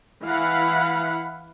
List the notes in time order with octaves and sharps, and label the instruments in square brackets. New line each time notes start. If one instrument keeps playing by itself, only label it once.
[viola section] E3 E4 F5 F#5 B5